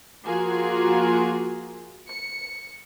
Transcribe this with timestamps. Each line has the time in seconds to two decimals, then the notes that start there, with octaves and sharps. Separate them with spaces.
0.24 F3 A#3 F4 F#4 G#4 A#4
2.09 C#7